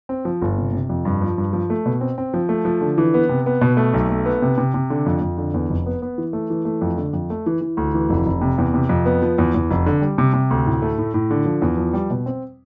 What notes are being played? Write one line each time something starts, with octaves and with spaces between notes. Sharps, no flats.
C4
F3
G1
C3
C3
F2
G2
F3
G2
F3
A3
B2
C4
C4
F3
A3
F3
D3
E3
B3
C3
B3
B2
A3
B1
A3
B3
C3
C3
C3
D3
F2
F2
D3
E2
F1
B3
B3
E3
A3
E3
A3
F2
D3
F2
A3
E3
E3
D2
E3
F1
F1
C3
E2
C3
F2
B3
F3
E2
E2
F1
D3
G3
C3
C3
D2
A2
A3
A2
A2
D3
F3
E2
F3
G3
B2
C4